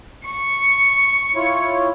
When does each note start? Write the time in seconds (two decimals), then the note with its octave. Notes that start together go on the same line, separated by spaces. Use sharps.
0.24 C#6
1.35 E4 F4 C#5